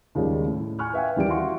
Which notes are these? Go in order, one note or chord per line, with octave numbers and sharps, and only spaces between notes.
D#2 C#3 F3 G3 G#3
A2
G#5 C#6 F6 F#6
B4 E5 F5 G5 G#5
D#2 E3 G3 G5 D7
E4 F#4 E5 F5 C6 C#6